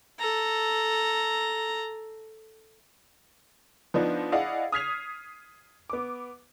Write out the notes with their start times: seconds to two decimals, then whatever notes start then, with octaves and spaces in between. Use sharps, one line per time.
0.19 A4 A#5
3.94 F3 B3 D4 D#4
4.32 E4 G#4 D5 D#5 F5 F#5
4.72 D#6 F6 G#6 B6 C7 F7
5.90 B3 D6